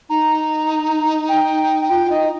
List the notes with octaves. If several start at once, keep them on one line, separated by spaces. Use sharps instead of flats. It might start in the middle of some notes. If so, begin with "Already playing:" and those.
D#4 A#5
G5
F4 G5
D#4 D#5